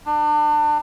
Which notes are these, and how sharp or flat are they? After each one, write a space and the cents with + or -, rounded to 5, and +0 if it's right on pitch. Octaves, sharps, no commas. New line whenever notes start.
D4 +30